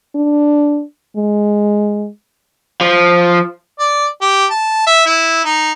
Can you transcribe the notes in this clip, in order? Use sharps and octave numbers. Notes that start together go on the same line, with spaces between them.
D4
G#3
F3
D5
G4
A5
E5
E4
D#4